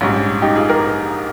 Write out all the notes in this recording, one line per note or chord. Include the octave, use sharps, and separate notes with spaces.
A#1 G#2 G3 C#4
D#4 G4
F4 G#4
G4 A#4